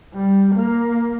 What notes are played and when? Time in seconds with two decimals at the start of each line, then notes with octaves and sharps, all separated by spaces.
0.14 G3
0.55 A#3